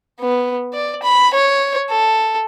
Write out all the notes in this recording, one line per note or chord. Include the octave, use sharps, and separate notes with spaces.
B3
D5
B5
C#5
A4